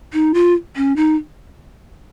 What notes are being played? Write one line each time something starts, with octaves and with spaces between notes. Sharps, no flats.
D#4
F4
C#4
D#4